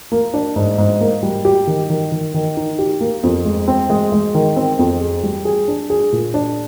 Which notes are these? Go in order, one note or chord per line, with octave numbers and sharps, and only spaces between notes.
A#3
D4
G#2
G#2
A#3
G3
G4
D#3
D#3
D#3
D#3
D#4
G4
A#3
F2
G#3
C4
G#3
G#3
D#3
C4
F2
G#4
G3
G#4
D4
G#4
A#2
D4